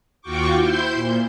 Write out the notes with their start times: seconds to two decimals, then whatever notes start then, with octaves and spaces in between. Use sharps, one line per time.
0.21 D#2 F4 F#4 G5 C#6 D6
0.56 E4 C5 C6 G6
0.94 A#2